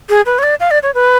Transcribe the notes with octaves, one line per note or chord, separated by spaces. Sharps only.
G#4
B4
C#5
D5
F5
D5
C#5
B4